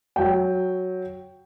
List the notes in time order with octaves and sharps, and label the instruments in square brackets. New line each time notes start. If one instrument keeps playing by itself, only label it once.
[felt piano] F#3 G5